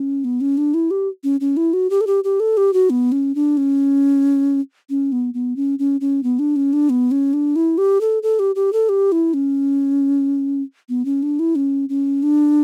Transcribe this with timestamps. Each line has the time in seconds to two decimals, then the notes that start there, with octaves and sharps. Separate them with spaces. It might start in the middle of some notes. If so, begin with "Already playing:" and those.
Already playing: C#4
0.24 B3
0.41 C#4
0.58 D4
0.74 E4
0.91 G4
1.24 C#4
1.41 C#4
1.57 E4
1.73 F#4
1.90 G4
2.01 A4
2.07 G4
2.24 G4
2.40 A4
2.57 G4
2.73 F#4
2.90 B3
3.12 C#4
3.35 D4
3.57 C#4
4.90 C#4
5.12 B3
5.34 B3
5.56 C#4
5.79 C#4
6.01 C#4
6.23 B3
6.39 D4
6.56 C#4
6.73 D4
6.90 B3
7.11 C#4
7.33 D4
7.56 E4
7.78 G4
8.01 A4
8.23 A4
8.39 G4
8.55 G4
8.73 A4
8.89 G4
9.12 E4
9.34 C#4
10.89 B3
11.05 C#4
11.23 D4
11.39 E4
11.56 C#4
11.89 C#4
12.23 D4